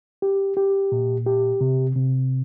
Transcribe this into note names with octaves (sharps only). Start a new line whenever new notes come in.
G4
G4
A#2
G4
C3
C3